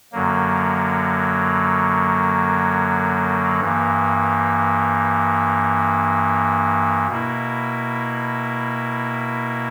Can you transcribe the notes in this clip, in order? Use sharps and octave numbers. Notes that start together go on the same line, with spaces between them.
F#2 D3 F#3 A#3
G2 E3 A#3
B2 A#3 E4